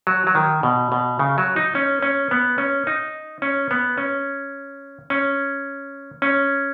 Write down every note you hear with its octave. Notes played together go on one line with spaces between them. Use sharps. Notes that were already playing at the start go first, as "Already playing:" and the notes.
F#3
F#3
D#3
B2
B2
C#3
F#3
D#4
C#4
C#4
B3
C#4
D#4
C#4
B3
C#4
C#4
C#4